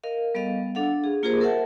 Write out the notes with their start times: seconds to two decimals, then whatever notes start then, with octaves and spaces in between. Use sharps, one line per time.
0.04 A#4 D#5 F5
0.35 G3 B3 A4 D#5 F5
0.75 D4 A4 F5 F#5
1.04 G#4
1.23 A#3 F4 G4 G#4 A#4 C5
1.40 A4 A#4 C5 E5 F#5 A5